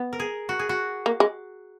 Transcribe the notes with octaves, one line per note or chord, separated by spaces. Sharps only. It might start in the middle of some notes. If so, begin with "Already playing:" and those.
Already playing: B3
A#4
G#4
F#4
G#4
F#4
A#3
G#3